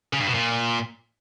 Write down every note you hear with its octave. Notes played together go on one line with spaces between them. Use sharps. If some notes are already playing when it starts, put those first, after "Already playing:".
C#3
G2
B2
A#2